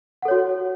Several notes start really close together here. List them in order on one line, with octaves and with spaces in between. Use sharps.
F#5 A4 C#5 F#4